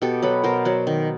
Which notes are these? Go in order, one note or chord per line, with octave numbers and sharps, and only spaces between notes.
B2 G4 A4
F#3 A4 B4
B2 A#4 C5
F#3 C5 D5
D#3